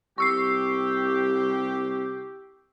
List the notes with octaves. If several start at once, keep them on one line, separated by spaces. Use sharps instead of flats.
C2 G4 C#6 E6 C7